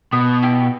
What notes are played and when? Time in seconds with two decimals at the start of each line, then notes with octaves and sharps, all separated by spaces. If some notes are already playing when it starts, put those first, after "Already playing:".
0.12 B2 B3
0.43 E4 G4